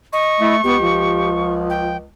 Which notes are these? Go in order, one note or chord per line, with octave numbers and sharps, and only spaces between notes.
D#5 C#6
A3 E4
C#2 B3 G4
F3
G5